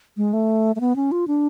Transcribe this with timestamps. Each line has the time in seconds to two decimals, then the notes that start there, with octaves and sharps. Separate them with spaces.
0.17 G#3
0.33 A3
0.76 A3
0.80 B3
0.96 C#4
1.12 F4
1.27 D4